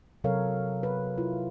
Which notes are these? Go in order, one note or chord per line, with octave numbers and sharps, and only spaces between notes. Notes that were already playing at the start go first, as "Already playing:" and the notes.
C3 F#3 A4 A#4 C#5 F5
B4
E4 F4